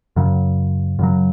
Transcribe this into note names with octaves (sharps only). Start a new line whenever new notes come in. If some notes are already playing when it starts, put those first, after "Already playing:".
F#2 C#3 F#3
F#2 C#3 F#3